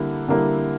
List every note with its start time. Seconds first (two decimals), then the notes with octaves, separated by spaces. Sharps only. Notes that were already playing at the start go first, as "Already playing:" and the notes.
Already playing: D3 G3 A#3 E4
0.28 D3 G3 A#3 E4